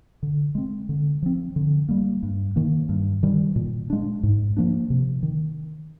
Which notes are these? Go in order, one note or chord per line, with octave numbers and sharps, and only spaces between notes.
D3
G#3 C4
D3
F3 C4
D3
G3 A#3
G2
D#3 A#3
G2
D#3 G3
A#2
G#3 D4
G#2
F3 A#3 D4
C3
D#3